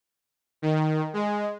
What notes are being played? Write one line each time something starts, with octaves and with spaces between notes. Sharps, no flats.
D#3
G#3